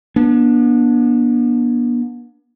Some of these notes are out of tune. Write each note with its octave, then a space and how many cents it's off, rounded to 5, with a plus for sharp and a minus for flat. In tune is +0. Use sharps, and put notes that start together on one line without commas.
B3 -40 D4 +0